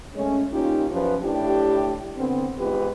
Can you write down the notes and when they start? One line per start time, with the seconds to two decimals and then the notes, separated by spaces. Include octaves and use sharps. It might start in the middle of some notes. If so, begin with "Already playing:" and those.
0.14 G#3 A3 C#4
0.50 A#2 C#4 D#4 F4 G4
0.91 F#2 F3 C#4 B4
1.22 A2 D4 E4 G4
2.17 D3 B3 C4
2.58 E2 G#2 F4 G4 B4